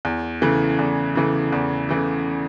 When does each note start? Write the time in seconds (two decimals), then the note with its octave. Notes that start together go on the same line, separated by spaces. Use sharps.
0.05 E2
0.42 C#3 E3 A3
0.79 E2
1.15 C#3 E3 A3
1.52 E2
1.89 C#3 E3 A3